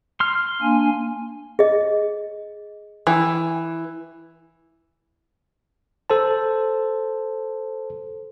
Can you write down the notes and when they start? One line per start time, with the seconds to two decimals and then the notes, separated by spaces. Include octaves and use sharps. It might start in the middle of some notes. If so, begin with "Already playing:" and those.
0.20 C6 F6
0.62 A#3 D4 G#5
1.59 G#4 D#5
3.07 E3
6.10 A4 C5 A5